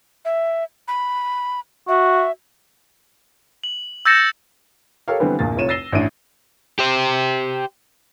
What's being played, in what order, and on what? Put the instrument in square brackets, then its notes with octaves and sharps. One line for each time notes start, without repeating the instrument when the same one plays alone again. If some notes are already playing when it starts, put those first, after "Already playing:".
[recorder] E5
B5
[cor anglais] F#4 [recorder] E5
[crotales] F#7
E6 G6 A6 A#6 C#7 E7
[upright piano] G4 A4 A#4 C#5 F5
D3 E3 G3 B3 C4
A#1 E2 A#2 F5 A6
F1 C2 F4 C#5 D#7 E7
E6 A6 A#6 C7 D#7 G7
A1 D4 E4 E5 D7 D#7
[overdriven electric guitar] G4 C5